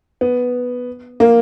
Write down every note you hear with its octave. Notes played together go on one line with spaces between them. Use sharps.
B3
A#3